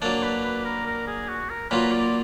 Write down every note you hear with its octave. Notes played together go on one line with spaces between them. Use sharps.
F#3 A#3 D4 D5
B4
B4
A#4
A#4
G#4
F#4
A#4
A#2 F#3 A#3 F4 B4
D5